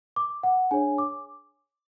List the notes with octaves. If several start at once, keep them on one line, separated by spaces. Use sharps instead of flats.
D6
F#5
D4 G#4 C#5 G#5
D6